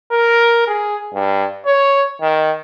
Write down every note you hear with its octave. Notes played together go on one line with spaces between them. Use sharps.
A#4
G#4
G2
C#5
D#3